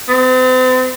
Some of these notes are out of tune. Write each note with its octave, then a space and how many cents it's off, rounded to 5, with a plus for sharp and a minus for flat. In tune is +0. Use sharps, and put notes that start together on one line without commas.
C4 -40